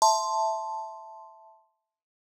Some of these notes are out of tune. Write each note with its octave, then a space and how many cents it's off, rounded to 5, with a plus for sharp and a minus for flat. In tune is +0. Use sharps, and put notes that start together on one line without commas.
E5 +0 A5 +0 C6 +0